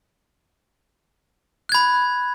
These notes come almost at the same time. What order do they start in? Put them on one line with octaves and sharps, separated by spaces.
F#6 G#6 B5